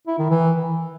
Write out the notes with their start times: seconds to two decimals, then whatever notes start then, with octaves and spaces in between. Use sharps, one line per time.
0.07 E4
0.18 D#3
0.30 E3